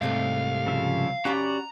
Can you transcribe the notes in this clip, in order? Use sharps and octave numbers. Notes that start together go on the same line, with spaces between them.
C2 G#2 C3 A3 F5
C#3 F3 E5
C#4 F#4 G4 D5 A#5 B5